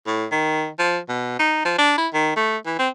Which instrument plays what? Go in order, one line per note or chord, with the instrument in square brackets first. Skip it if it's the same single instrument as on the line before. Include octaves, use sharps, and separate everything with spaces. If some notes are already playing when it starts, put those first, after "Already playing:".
[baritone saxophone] A2
D#3
F3
B2
D#4
F3
D4
E4
D#3
A3
E3
C4